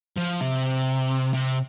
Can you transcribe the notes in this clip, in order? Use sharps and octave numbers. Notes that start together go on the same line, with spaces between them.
F3
C3
C3